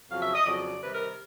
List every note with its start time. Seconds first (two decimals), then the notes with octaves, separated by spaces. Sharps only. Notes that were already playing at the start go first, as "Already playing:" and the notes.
0.08 F2 C#3 F#3 F5
0.20 E5
0.33 D#5
0.45 F2 C#3 F#3 D5
0.81 C3 D#3 G3 B4
0.93 A#4